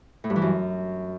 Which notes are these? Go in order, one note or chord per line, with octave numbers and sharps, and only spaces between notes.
A2
G2
E3
F#2